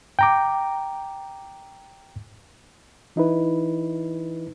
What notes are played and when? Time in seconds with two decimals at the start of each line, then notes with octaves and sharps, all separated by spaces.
0.19 G5 A#5 D6
3.16 E3 D#4 E4 B4